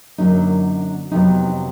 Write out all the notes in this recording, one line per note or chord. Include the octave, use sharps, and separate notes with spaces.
F#2 D3 F#3 A#3 C#4 D#4
F2 C3 D#3 F#3 B3 D#4